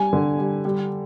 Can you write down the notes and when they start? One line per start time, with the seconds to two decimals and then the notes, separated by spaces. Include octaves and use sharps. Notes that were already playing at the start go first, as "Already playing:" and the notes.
Already playing: G3 G#5
0.13 D3
0.39 G3
0.65 G3